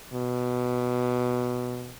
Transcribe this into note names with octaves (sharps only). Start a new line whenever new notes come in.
B2